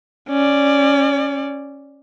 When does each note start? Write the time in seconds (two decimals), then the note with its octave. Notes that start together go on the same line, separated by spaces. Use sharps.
0.29 C#4 D5